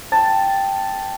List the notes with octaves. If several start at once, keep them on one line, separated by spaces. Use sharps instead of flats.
G5 A5